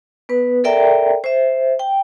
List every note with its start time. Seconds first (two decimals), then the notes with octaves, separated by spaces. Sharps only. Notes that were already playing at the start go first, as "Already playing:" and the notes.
0.29 B3 B4
0.64 A4 A#4 D5 E5 G5 A#5
1.24 C5 E5
1.79 G5